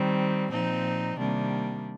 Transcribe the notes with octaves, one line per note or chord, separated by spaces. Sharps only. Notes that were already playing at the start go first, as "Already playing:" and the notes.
Already playing: D#3 G3 C4
A#2 F3 C4 D#4
C3 D#3 G3 A#3 D4